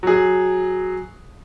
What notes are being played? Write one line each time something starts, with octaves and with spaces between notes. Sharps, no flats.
F#3 G#4